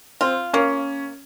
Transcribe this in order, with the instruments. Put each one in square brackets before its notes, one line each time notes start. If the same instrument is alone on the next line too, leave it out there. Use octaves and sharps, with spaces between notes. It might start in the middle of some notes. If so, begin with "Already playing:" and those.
[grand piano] C4 [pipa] F4
[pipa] A#3 [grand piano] C#4